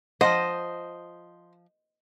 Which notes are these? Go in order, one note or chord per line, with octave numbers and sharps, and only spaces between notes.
F3 F#3 C5 D#5 F#5